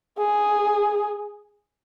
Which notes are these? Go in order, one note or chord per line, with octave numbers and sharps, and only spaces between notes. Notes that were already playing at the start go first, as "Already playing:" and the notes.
G#4